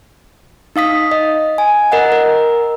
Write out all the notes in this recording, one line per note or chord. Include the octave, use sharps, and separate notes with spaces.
D#4 F5 D#6 B6
D#5
G#5
A#4 D#5 F#5
A#4